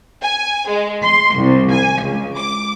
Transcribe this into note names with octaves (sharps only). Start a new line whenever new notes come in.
G#5
G#3
C6
C2
G#5
C#2
D6